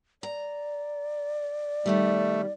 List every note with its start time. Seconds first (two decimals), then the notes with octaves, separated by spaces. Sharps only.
0.23 D5 A#5
1.86 B2 D#3 G3 A3